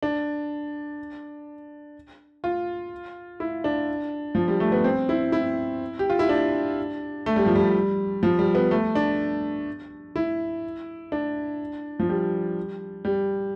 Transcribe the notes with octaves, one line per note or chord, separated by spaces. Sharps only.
D4
F4
E4
D4
F3
G3
A3
B3
C4
E4
E4
G4
F4
E4
D4
A3
G3
F3
G3
F3
G3
B3
A3
D4
E4
D4
F3
G3
G3